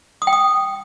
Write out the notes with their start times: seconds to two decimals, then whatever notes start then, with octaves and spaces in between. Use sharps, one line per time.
0.22 D#6
0.27 G5
0.33 D#6